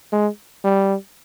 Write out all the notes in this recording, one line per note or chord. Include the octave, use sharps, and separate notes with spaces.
G#3
G3